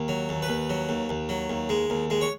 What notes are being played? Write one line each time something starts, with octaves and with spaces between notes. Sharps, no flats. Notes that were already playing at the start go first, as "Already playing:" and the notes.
Already playing: D#2
F#3
D#2
B4
D#2
F#3
D#2
D#2
F#3
D#2
G#3
D#2
G#3
C#5